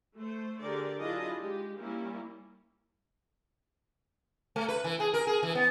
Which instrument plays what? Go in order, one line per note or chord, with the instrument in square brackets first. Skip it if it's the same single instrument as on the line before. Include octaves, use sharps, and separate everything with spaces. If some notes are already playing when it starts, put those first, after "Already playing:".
[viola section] A3 C5
D3 G4 G#4 A#4 D5
F#3 D4 E4 F4 G#4 D#5
G#3 G4
G3 A#3 C#4 E4
[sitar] A3
B4
E3
G#4
A#4
G#4
E3
B3